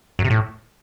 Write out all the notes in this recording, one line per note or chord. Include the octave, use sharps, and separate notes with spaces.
F#2
C3
A2